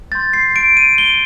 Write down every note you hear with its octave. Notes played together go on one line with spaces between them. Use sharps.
C6 G6 A6
C7
D7
D#7
G7